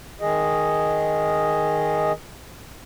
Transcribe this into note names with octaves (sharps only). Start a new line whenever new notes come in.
D#3 G#4 D#5